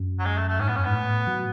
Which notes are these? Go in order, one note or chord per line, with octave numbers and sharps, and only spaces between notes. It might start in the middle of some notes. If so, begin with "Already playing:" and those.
Already playing: F#2
F#3
G#3
A3
A3
G#2 C#4
A2 B3
F#2 C#4
G#2 B3
A2
F#3